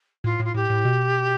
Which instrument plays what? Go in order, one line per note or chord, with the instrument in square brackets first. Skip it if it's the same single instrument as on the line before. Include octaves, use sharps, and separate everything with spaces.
[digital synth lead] A2 [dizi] F4
[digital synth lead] A2 [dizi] F4
[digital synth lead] A2 [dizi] G4
[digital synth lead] A2
B2